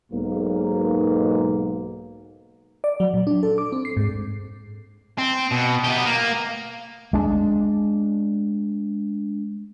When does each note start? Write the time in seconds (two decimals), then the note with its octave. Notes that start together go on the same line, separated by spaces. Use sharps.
0.12 B1 G#2 A#3
2.84 D5
3.00 F#3
3.14 A#2
3.27 D4
3.43 A4
3.58 D6
3.72 C4
3.85 C7
3.97 G#2
5.18 C4
5.52 B2
5.84 B3 G4
6.05 A#3
7.13 G#3 D4